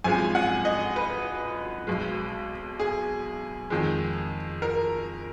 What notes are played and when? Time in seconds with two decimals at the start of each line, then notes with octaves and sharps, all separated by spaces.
0.04 G#1 F#2 F3 G#3 G#5
0.35 F#5
0.65 D#5
0.96 B4
1.87 B1 B2 G#3
2.80 G#4
3.70 F2 D#3 G#3
4.62 A#4